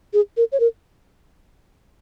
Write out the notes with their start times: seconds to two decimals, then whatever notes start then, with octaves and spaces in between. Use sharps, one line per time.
0.13 G#4
0.37 A#4
0.52 C#5
0.60 A#4